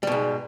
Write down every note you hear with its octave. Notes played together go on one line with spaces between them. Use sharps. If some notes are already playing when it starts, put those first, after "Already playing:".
G#2 B2 G3